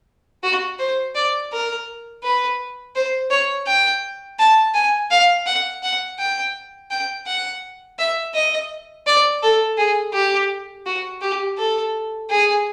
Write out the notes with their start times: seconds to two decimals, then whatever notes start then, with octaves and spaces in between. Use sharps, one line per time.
0.43 F#4
0.79 C5
1.15 D5
1.52 A#4
2.24 B4
2.96 C5
3.31 C#5
3.67 G5
4.39 A5
4.74 G#5
5.11 F5
5.46 F#5
5.83 F#5
6.19 G5
6.91 G5
7.27 F#5
7.99 E5
8.34 D#5
9.07 D5
9.43 A4
9.78 G#4
10.14 G4
10.86 F#4
11.21 G4
11.58 A4
12.30 G#4